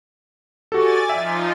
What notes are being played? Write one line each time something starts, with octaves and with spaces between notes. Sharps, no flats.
F#4 G4 A4 D5 G#5 A6
F3 D#4 F4 E5 G5